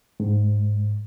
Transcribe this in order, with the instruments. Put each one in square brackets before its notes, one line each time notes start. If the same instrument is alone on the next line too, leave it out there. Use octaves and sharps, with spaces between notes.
[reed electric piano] G#2